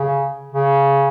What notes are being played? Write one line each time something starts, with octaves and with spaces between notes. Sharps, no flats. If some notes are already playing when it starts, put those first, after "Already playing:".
Already playing: C#3
C#3